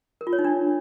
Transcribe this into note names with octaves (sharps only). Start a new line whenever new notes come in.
A#4
F4
C#5
D#4
D4